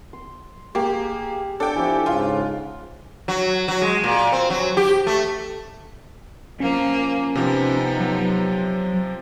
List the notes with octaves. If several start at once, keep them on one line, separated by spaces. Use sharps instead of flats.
C6
A#3 G4 G#4
D4 A4 G5
F3 E4 G4 D5 G#5
G#2 C#3 F4
F#3
F#3
G#3
A#2
C4
F#3
G4
A3
F3 A#3 C#4
C3 F3 B3 D#4
F#3